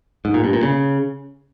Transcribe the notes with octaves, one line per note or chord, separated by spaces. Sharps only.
G#2
A#2
G2
A#2
C#3